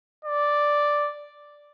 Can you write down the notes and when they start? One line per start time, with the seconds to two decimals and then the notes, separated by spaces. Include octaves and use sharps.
0.25 D5